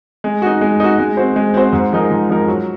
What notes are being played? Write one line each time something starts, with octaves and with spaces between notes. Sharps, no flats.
G#3
D#4 F#4
G#3
D#4 F#4
G#3
C4 F#4 C5
G#3
C4 F#4 C5
G#2
F3 G#3 D#4 A#4
G#2
F3 G#3 D#4 A#4
F#3